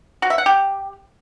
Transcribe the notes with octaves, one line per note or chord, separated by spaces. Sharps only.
F#4
E5
F#5
G4